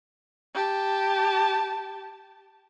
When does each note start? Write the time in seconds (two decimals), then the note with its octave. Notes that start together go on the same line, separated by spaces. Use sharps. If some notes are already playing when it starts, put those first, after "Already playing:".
0.54 G4 A5